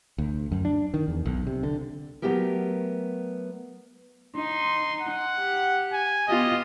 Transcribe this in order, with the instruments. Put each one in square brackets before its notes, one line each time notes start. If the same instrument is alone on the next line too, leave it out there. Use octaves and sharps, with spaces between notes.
[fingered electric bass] D2
F#2
D4
D#3
E2
B1
C3
D3
[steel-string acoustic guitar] F#3 G3 A3 B3 G4 A#4
[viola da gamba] D#4 [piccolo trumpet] C6
[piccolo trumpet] F#5
[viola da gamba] G4
[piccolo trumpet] G#5
[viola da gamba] B3 F4 G4 [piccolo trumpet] D#5